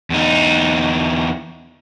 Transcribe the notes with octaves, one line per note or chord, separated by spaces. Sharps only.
E2 D#4